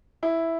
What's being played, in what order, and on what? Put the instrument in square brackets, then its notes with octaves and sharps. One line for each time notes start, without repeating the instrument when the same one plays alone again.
[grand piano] E4